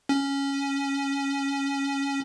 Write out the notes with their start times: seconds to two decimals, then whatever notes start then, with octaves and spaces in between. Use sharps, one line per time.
0.09 C#4